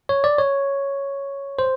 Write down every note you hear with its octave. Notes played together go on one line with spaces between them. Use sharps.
C#5
D5
C#5
C5